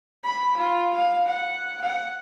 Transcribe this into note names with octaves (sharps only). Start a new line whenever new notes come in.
B5
F4
F5
F#5
F#5